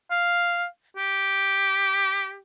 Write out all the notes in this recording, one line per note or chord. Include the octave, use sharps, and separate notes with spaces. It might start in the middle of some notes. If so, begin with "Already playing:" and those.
F5
G4